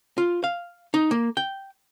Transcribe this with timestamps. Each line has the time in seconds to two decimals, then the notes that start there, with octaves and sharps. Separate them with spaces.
0.18 F4
0.44 F5
0.94 D#4
1.11 A#3
1.37 G5